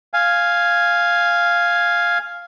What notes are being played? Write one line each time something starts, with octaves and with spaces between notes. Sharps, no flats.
F5 G#5